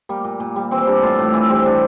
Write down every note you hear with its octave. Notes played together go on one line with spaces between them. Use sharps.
G3 A#3
A#2
A#2
G3
E3 C4
G3 D4
A2 F4
A2
E3 E4
G3 C4
C3 D4